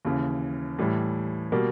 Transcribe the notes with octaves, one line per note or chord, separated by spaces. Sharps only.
D#2 C#3 E3
A2 E3 G3
B2 G3 A#3